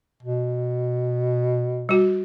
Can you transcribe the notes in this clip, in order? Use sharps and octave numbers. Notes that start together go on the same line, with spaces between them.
B2
G3 F#4